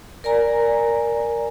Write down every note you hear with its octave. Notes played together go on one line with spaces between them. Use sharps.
A#4 D5 G#5 A#5